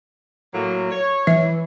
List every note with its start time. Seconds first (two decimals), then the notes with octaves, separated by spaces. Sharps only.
0.54 A2 F#3 A#3
0.91 C#5
1.27 E3 E5